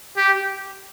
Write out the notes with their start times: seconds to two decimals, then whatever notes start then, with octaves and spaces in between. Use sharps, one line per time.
0.17 G4